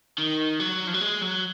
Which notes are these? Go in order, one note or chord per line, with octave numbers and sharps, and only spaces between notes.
D#3
F#3
F3
F#3
G#3
F#3